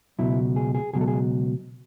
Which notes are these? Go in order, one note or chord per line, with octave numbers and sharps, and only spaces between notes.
C#2 B2 F#3 E4
G#4
G#4
C#2 B2 F#3 G#4
A4
G#4